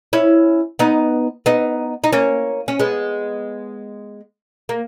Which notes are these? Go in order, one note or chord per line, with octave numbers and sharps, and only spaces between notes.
C#4 E4
B3 D#4
B3 D#4
D#4
A#3 C#4
C#4
G#3 B3
A#3